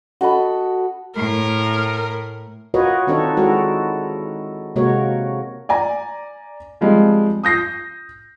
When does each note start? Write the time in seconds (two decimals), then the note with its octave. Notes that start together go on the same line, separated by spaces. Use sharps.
0.21 F#4 A4 D#5 B5
1.16 A2 A#4
2.74 F4 F#4 A#4 B4 C#5 D#5
3.07 D#3 C4 D4 D#4 A4 C#5
3.37 G#3 E4 F#4 A4 A#4
4.76 C3 G#3 A#3 F#4 A#4 C#5
5.69 D5 G#5 A#5
6.81 F3 G3 G#3 C4
7.43 D#6 G6 A#6 C7